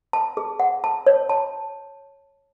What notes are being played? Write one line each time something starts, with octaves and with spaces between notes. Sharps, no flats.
A5
G#4
F#5
A5
C#5
A5